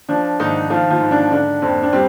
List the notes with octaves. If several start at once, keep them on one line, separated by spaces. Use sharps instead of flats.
F3 D4
G#2 D#3 D#4
D#3 F3 F4
F3 F4
G#2
D4
D3 D4
F2 C4
D4
G3 C4